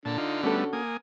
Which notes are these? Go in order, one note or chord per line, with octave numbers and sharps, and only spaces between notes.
A#2 D3 A5
D#4 F4
G3 A3 B3 C#4 F#4 A4
A#3 G#5 D#6